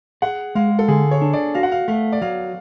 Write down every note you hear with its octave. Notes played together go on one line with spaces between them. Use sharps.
G#4 F#5
G#3 F5
A4
D3 G#4
C#5
D4
D5
F#4 F5
F#5
F5
A3 F5
D5
F#3 F5